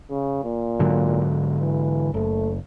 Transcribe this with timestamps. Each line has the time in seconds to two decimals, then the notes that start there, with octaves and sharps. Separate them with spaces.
0.10 C#3
0.44 A#2
0.79 G#2 D3 F#3
1.61 E3
2.14 F#1 A3